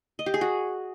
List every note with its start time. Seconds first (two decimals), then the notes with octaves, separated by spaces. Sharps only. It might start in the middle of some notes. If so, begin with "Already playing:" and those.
0.19 D#5
0.26 G4
0.34 G#4
0.41 F#4